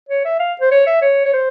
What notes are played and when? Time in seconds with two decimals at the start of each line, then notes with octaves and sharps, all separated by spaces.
0.09 C#5
0.25 E5
0.40 F5
0.61 C5
0.71 C#5
0.87 E5
1.02 C#5
1.26 C#5
1.33 C5